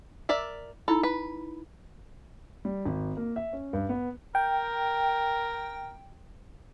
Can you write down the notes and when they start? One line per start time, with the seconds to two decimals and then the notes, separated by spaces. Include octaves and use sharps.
0.29 A#4 D5 E5
0.88 D#4 E4 A4 B5
1.03 B4
2.65 G3
2.85 G#1
3.17 A#3
3.36 E5
3.53 C#4
3.73 G2
3.89 B3
4.35 A#4 G5